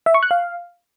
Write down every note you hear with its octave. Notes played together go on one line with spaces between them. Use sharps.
E5
C#6
F#6
F5